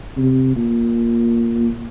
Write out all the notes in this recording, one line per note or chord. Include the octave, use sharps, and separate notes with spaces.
C3
A#2